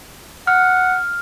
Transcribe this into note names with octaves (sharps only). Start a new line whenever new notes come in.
F#5 F6